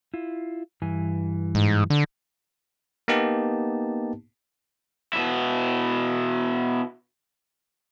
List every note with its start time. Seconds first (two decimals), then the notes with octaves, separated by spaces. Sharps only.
0.14 E4 F4
0.82 G2 E3 G#5
1.55 G#2
1.90 D3
3.08 A#3 B3 D#4 G4 A5
5.13 B2 E4